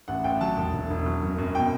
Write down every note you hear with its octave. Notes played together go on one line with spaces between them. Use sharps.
A1 F#5
A1 G5
F#3 A5
E1
E1
E1
F#3
F#2
F#2
B2 G5